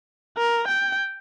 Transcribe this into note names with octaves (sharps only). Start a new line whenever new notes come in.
A#4
G5